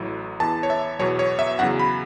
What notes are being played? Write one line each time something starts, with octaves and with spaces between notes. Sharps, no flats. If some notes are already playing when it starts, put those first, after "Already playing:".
Already playing: A1 A2 F#3
E2 E3 A5
C#5
E5
E2 B2 F#3 C#5
C#5
E5
E2 C#3 F#3 F#5
B5